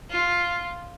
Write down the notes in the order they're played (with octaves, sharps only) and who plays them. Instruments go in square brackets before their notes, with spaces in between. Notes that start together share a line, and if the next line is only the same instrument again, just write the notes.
[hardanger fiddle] F4